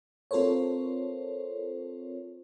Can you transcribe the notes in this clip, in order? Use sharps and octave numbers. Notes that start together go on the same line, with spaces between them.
C4 F4 A4 A#4 C5 C#5